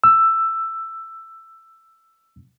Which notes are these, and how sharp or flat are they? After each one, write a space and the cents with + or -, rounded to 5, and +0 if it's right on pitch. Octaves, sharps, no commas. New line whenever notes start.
E6 +10